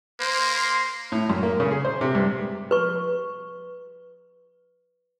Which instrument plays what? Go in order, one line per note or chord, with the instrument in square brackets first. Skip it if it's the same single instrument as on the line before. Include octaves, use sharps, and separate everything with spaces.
[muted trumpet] A#3 [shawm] C5
[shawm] C6
[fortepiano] A2
F#2
A#3
C#3
G#4
C5
C3
G2
[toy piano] B4 C#6